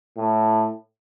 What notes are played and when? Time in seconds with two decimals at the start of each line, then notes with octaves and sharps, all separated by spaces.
0.17 A2